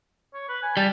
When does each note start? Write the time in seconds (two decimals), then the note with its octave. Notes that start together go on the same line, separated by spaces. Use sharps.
0.34 C#5
0.49 B4
0.63 G#5
0.77 G3 A5